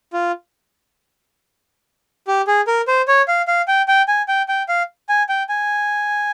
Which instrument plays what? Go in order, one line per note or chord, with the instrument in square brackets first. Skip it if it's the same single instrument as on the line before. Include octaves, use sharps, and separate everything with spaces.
[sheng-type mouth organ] F4
G4
G#4
A#4
C5
C#5
F5
F5
G5
G5
G#5
G5
G5
F5
G#5
G5
G#5